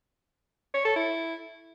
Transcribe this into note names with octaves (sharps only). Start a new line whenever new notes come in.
C#5
A4
E4